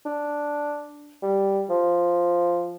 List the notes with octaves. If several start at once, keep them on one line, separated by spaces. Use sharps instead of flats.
D4
G3
F3